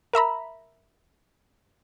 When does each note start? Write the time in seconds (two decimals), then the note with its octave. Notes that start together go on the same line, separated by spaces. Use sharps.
0.13 A#4 E5 A#5 B5